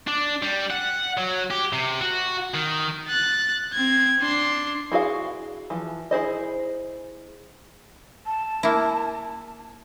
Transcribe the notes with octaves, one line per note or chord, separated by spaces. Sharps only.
D4
G3
F#5
F#3
G4
C3
F#4
D#3
F#6 A6
C4 G#6
D4 C6
E4 F#4 G#4 F5
E3 F3
E4 G#4 C5 D#5
A5
A#3 E4